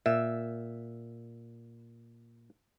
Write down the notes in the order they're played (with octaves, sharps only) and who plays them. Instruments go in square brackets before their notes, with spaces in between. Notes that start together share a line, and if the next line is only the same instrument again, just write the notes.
[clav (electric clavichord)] A#2 [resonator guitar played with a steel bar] E5